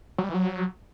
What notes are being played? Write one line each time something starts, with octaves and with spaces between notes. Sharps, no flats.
F#3
G3
E3
F#3